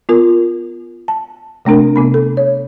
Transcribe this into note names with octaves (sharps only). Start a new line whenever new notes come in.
B3 F4 A#4
A5
C3 A3 C4 D4 A#4
C3 B3 B5
A4
C#5